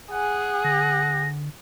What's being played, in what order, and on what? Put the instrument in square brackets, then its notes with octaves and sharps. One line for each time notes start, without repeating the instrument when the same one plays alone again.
[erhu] G#4 [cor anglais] F#5 [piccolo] G#5
[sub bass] D3 [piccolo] A#6